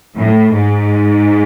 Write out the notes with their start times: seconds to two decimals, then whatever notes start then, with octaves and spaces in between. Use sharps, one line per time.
0.17 A2
0.53 G#2